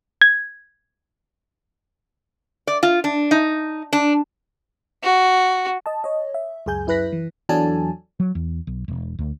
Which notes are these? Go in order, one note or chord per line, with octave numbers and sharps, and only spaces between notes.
G#6
D5
F4
D4
D#4
D4
F#4
D#5 A5
C#5 D#5
E5
C#2 F#2 G#4 G#5 G6
F#2 E4 B4 F#6 A#6 B6
E3
E2 F#3 D4 A4 G#5 A5
F#3
E2
B1
E1
D2